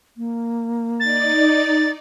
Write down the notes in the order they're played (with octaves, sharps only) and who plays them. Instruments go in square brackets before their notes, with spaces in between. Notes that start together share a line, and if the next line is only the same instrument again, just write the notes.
[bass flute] A#3
[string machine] D#4 D5 [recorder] A6